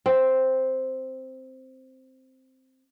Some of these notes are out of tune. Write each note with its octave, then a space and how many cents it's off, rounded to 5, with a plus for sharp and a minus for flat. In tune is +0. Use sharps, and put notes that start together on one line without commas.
C4 +0 E5 +0